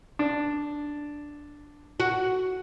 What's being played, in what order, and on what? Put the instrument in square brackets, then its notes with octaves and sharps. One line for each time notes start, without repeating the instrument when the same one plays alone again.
[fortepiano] D4
[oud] F#4